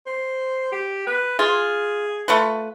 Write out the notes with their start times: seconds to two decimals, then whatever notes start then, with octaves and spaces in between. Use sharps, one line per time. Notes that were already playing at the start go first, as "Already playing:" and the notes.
0.06 C5
0.72 G4
1.07 B4
1.39 F4 G#4
2.28 A3 F4 B4